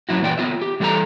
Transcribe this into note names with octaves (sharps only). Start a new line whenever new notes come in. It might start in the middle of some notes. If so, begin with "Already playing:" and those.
F#2 C3 F#3 E4 F#4
A#2 E3 D5 G5
B3 F4 E5
G4
E3 G3 A4 F#5 A#5